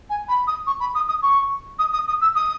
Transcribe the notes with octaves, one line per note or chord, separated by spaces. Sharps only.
G#5
B5
D#6
C#6
B5
D#6
D#6
C#6
D#6
D#6
D#6
E6
D#6